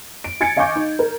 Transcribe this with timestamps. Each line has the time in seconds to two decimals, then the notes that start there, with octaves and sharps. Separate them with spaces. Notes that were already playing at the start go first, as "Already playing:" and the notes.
0.24 D7
0.41 G#5 G#6 A6 C#7 D7
0.57 D#5 F5 G#5 C#6 D6 G6
0.76 D#4
0.99 A#4